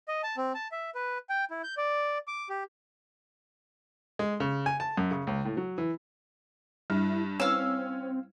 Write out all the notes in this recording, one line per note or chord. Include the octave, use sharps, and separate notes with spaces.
D#5
A5
C4
A5
E5
B4
G5
E4
G6
D5
D6
G4
G#3
C#3
G#5
A5
F#2
C#3
C#2
A2
F#3
E3
G2 G3 E4
C4 C#4 E4 B4 F5 E6